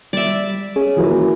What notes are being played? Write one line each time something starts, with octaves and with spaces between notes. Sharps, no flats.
G3 D5 E5
C#4 G#4
E3 F#3 A#3